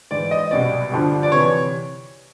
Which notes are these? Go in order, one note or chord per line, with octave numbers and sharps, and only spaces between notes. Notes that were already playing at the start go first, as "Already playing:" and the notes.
G#2 E3 D5
D#5
C2 B2 F#3 D5
G2 D3 F3
D5
C3 E3 C#5